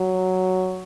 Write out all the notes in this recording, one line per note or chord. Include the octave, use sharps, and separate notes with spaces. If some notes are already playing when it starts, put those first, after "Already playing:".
Already playing: F#3